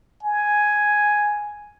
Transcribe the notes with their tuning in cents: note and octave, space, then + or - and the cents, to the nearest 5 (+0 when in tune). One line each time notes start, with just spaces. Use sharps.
G#5 +5